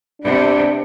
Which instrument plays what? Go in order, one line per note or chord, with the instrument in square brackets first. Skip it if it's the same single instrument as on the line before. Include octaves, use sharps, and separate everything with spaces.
[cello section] C3 B3 [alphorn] D4